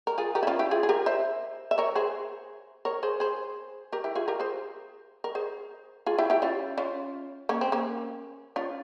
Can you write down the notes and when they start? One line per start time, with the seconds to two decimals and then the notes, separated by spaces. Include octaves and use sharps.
0.07 A#4
0.18 F4 G#4
0.35 G4 A#4
0.43 E4
0.47 C#4 F4
0.59 E4 G4
0.71 F4 G#4
0.83 G#4
0.89 G4 A#4
1.06 C5 E5
1.71 E5
1.78 A#4 C#5
1.95 G#4 C5
2.85 A#4 C#5
3.03 G#4 C5
3.20 G#4 C5
3.92 G4 A#4
4.04 E4 G4
4.16 F4 G#4
4.28 G4 A#4
4.40 G#4 C5
5.24 A#4
5.35 G#4 C5
6.06 F4 G#4
6.18 E4 G4
6.30 E4 G4
6.42 C#4 F4
6.78 C#4 F4
7.49 A#3 C#4
7.61 C4
7.72 A#3 C#4
8.56 C#4 F4